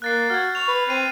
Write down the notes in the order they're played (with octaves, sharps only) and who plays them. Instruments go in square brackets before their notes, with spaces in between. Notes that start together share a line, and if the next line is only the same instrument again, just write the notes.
[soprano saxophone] A#3 [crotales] F#6 A6 C7
[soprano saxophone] F#4 [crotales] F6 G#6
[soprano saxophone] C#6 [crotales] F7
[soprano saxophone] B4
[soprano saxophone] C4 [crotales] C7 D#7